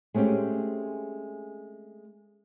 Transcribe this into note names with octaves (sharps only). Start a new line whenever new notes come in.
G#3 A3 C4 C#4 G4